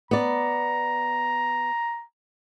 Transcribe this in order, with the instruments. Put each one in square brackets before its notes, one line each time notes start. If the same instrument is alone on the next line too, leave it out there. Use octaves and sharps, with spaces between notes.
[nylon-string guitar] B3 D5 [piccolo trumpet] A#5